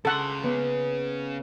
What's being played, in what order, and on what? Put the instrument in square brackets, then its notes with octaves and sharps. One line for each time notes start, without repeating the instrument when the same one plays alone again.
[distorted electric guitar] C#3 C6 [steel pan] A4 F#5
[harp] B3